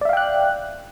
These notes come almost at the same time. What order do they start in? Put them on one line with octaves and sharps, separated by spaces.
D5 E5 F5 G5 F#6